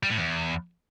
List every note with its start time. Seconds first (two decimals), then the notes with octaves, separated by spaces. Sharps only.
0.03 G3
0.10 A2
0.18 E2